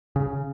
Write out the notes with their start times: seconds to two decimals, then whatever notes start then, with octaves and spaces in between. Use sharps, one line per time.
0.16 C#3